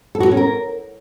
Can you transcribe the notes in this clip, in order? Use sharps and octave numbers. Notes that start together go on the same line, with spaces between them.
A4
F#4
A4
C#4
A#4